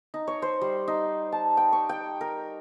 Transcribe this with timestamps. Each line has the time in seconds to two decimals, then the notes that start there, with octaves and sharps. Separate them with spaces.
0.14 D#4
0.27 C#5
0.42 C5
0.61 G3
0.88 D#4
1.32 A5
1.57 G5
1.72 C#6
1.89 G5
2.21 A#4